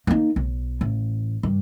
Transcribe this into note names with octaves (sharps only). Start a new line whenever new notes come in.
A#3 D#4
B1
A1
G2